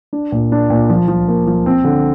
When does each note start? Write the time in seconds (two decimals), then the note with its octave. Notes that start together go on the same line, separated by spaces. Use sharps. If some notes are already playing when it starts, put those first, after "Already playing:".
0.13 D4
0.32 A#2
0.52 D4
0.70 A#2
0.89 F3
1.08 F3
1.28 A#3
1.47 F3
1.66 C4
1.84 D3